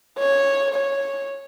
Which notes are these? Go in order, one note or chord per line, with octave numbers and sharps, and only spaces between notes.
C#5
C#5